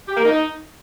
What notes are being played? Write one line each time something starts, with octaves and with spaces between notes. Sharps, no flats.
G4
A#3
D#4